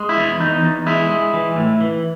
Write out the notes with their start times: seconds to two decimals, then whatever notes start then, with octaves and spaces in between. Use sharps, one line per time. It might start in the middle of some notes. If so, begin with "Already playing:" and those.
Already playing: G#3
0.09 E4
0.17 E2
0.40 E2 D#4
0.63 E2
0.86 G#3 E4
1.10 G#3
1.33 E3
1.56 A2
1.81 E3